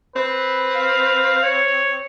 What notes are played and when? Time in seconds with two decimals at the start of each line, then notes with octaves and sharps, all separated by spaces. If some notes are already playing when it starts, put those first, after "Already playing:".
0.16 C4 B4
0.76 F5
1.43 C#5